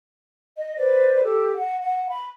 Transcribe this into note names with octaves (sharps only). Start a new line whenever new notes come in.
D#5
B4 C5 D5
G4 A4
F#5
F#5
B5